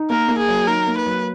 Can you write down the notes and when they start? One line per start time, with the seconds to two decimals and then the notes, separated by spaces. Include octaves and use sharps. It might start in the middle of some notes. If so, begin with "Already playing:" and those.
Already playing: D#4
0.10 A#3 A#4
0.28 A#3
0.38 G#4
0.48 F#3
0.67 D#4 A#4
0.87 A#3
0.97 B4
1.06 F#3